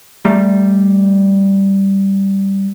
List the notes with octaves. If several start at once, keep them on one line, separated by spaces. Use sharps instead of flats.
G3 A3 A#5